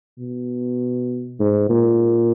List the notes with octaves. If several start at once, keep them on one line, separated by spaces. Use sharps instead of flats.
B2
G#2
A#2